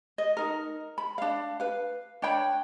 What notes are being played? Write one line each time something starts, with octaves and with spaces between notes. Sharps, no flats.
D#5
D#4 A#4
B5
D4 F5
B4 F5
D4 C#5 G5 B5